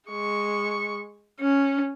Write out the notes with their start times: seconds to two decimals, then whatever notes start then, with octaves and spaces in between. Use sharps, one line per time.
0.10 G#3 C#6
1.41 C#4